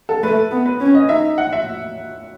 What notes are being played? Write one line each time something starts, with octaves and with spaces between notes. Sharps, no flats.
A4
A3 B4
B3
B4
C#4
D#5
D#4 E5
F#5
E5